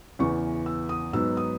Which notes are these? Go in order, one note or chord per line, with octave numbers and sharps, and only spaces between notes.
E2 C#3 E3 B3 C#6
E6
D#6
G#2 F#3 B3 D#4 E6
D#6